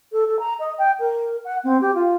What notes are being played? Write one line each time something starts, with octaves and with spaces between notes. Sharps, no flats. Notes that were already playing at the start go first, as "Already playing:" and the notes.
A4
A4
A#5
D#5
G5
A#4
F#5
C4
G4
F4